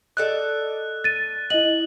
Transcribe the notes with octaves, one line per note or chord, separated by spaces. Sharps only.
A4 D5 D#5 F#6
A6 D#7
E4 D#5 F#7